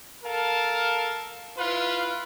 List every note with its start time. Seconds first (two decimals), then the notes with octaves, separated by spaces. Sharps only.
0.23 A4 A#4 F5 A5
1.58 E4 F4 B4 F5